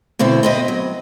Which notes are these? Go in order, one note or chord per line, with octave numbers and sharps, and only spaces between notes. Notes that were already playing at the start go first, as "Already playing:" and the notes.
B2 D3 C4 E4
C4 B4 D#5
F#3